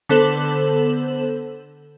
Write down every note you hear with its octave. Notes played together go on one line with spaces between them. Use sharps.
D3 B3 A4 C5 E7 F#7